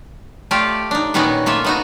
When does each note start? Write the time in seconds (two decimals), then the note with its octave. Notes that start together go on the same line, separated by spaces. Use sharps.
0.51 A3 F4 G4 D5 F5
0.91 D4 D#4
1.14 A#2 D#3 B3 C#4 D#4 F#4
1.46 A3 A#3 F4 E5
1.64 B3 D#4 F#4